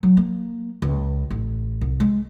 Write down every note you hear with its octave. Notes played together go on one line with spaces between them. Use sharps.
F#3
A#3
C#2
A1
C2
G#3